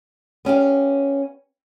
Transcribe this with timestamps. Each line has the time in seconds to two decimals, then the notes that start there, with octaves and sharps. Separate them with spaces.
0.45 B3 C#4 G4 F5